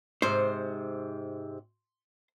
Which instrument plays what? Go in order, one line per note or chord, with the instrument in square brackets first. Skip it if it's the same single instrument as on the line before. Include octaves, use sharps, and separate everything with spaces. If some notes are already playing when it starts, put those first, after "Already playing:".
[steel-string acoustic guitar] G#2 C3 [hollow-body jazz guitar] C5